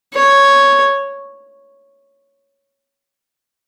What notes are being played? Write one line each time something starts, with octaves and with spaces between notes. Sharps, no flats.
C#5